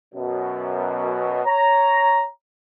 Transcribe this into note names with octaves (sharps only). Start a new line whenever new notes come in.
F#2 B2
C#5 A#5